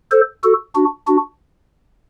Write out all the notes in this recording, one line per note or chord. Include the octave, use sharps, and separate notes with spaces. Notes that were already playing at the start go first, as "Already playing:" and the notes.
A4 C5
F#4 A4
D4 F#4
D4 F#4